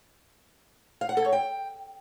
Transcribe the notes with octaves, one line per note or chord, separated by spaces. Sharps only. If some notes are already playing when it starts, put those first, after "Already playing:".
F5
F#5
A4
C#5
G5